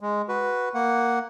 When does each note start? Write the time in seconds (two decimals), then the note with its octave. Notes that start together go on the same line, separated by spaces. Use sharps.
0.01 G#3
0.29 F#4 B4
0.74 A#3 F#5